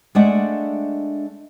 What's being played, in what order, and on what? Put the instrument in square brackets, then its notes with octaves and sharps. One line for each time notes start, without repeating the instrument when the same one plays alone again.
[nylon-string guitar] G#3 A3 D4 D5 E5 F#5